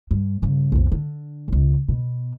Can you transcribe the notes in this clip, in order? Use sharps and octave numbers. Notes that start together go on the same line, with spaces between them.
G2
G2 C#3
B1 F2
D3
E1 C#2
B2